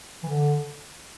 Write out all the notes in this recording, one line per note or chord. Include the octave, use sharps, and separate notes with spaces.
E3
D3